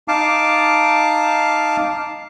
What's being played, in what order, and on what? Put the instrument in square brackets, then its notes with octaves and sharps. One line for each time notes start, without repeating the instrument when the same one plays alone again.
[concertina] D#4 F5 A5 D6